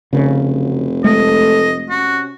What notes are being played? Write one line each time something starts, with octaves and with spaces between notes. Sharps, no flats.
F1 C#3 A#4
F#3
G#3 A3 A4 D#5
C3 C#4 F#4